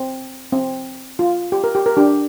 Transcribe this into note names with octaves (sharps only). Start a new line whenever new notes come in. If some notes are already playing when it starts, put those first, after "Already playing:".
Already playing: C4
C4
F4
G4
A#4
G4
A#4
D4 G4